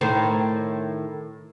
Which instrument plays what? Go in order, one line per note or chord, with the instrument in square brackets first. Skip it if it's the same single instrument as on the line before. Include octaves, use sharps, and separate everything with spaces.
[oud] A2 D#3 C5